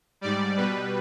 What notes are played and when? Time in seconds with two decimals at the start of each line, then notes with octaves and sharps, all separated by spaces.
0.21 G#2 G3 D5
0.57 B2 G3 B4